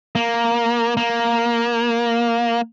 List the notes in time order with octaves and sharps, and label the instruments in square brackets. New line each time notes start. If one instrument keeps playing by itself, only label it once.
[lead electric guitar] A#3
A#3